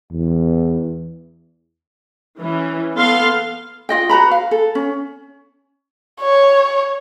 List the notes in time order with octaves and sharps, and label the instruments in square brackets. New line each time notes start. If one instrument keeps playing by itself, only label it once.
[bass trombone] E2
[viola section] E3 C#4
B3 A4 F5 C6
[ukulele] F4 D#5 G5
F#4 B4 A#5 B5
F5
A4
C#4
[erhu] C#5